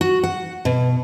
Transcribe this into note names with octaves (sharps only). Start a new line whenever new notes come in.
F#4
F#5
B2